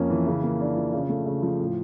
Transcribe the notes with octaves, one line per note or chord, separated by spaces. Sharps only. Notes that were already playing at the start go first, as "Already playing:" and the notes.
Already playing: F2 A#3 C#4
E3
C#3
A#3
D4
F3
C#3
A3
C#3
F3
A2